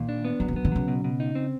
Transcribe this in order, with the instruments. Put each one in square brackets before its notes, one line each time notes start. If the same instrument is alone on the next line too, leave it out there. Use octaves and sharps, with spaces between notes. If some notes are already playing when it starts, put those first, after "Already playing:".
Already playing: [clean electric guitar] A#2 [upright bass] D#3
[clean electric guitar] D4
B3
[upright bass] D#3 [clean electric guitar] F#3
[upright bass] C#3
D3
[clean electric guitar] B3
[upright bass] D3
[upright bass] C#3 [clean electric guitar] F#3
[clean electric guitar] B2
B2
D#4
C4